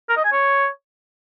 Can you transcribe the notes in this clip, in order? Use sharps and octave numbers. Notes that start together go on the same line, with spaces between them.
A#4
D#5
G#5
C#5